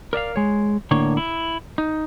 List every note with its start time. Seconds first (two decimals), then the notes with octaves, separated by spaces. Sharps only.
0.13 A#4 D5 E5 F5
0.36 G#3 C#5
0.91 A2 D3 A#3 C#5
1.17 E4
1.78 D#4